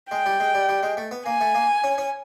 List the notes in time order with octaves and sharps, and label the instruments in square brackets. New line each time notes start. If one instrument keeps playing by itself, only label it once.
[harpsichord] G#3 [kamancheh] G5
[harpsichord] G3
G#3
G3
G3
G#3
A3
B3
[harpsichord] A#3 [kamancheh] G#5
[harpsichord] A3
A#3
C#4
C#4